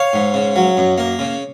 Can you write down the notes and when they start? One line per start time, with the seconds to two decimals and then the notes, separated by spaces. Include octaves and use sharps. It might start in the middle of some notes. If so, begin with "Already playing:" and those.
Already playing: C#5 F5
0.13 G#2
0.34 C#3
0.56 F#3
0.77 F#2
0.98 A#3
1.19 C#3